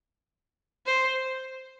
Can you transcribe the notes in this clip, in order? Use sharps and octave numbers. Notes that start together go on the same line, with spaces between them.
C5